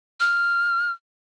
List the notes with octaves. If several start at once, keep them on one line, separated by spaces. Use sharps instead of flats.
F6